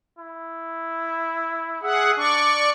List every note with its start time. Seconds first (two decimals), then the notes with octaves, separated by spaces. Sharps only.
0.19 E4
1.83 G#4 E5 F#5
2.17 D4 D5 C#6